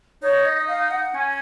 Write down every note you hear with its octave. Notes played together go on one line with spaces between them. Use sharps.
D#4 C#5
D#5
F5
F#5
C#4 G#5